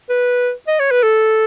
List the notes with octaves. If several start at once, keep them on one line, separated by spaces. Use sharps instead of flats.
B4
D#5
C#5
B4
A4